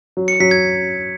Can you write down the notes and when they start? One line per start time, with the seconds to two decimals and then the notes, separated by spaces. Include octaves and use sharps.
0.17 F#3
0.28 C#7
0.40 F#3 B6
0.51 G#6